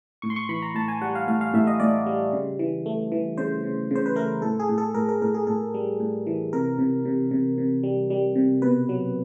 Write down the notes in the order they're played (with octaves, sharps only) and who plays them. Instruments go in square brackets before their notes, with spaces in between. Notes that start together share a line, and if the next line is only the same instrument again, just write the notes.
[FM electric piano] A2 C#6
C6
C#6
E3 B5
A#5
A2 A5
G#5
G3 F#5
F5
A2 F5
F5
A2 E5
D#5
A2 D5
G3
C#3
E3
A3
E3
C#3 C5
C#3
C#3 C5
B4
A3 A#4
A2 A4
G#4
A2
A4
A2 A#4
A#4
A2 A#4
G#4
A2 A4
G3
A2
E3
C3 A#4
C3
C3
C3
C3
G3
G3
C3
B2 B4
F#3